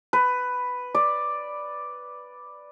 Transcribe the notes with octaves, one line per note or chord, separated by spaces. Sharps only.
B4
D5